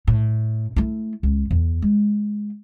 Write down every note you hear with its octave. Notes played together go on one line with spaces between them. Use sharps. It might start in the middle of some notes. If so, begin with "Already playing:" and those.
A2
A3 E4
C#2
E2
G#3